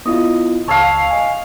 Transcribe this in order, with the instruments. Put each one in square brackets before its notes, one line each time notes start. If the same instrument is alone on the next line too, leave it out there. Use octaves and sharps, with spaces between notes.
[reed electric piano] B3 E4 F4 [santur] D#5
[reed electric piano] C#2 A5 E6 [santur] C#5 F5
[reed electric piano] D#5 G#5